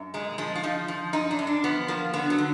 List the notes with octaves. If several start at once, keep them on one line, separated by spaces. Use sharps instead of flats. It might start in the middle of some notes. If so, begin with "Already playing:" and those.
Already playing: F#2
A#2 G#3
F3 G#3
F4
F3 D#4
F3
F#2 D#4
D4
F#2
D4
F3 B3
F3 A#3
D3 B3
F#3
D3